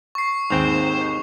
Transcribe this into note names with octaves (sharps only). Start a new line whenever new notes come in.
C#6 C7
D#2 G#2 C4 C5 G5 F7